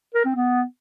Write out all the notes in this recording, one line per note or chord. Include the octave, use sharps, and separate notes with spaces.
A#4
C4
B3